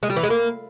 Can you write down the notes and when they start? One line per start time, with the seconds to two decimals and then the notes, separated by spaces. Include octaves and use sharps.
0.03 G#3
0.10 G3
0.16 E3
0.23 G#3
0.30 A#3